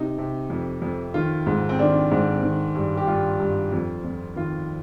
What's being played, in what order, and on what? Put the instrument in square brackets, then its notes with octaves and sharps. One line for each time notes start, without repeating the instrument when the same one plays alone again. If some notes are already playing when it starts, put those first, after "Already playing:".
Already playing: [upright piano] C3 D#4
C3
F2
F2
D#3 F4
G#2
C4
D#3 D4
G#2
D#3
G2
G4
G2 F4
G2
F2
F2
D#3 F4